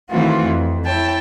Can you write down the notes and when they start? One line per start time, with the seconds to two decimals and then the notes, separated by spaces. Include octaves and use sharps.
0.10 D#3 E3 A3 C4 F4 F#4
0.44 F2
0.85 E4 C#5 G5 A5